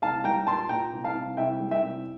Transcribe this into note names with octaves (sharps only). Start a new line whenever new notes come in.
C2 F5 A5
G3 G5 A#5
A#2 A5 C6
A#2 G5 A#5
C2
F5 A5
C2
C2 E5 G5
G3
E5 G5
C2